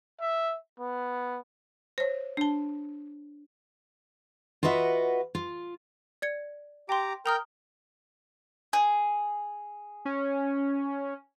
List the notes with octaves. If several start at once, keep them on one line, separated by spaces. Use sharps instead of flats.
E5
B3
C5 C#5
D4 A5
F4 F#4 B4 D#5 E5 F#5
F4
D5 G#6 C#7
G4 G5 A#5 C6 D6
A#4 G5 A#5 D#6 F6 G6
G#4
C#4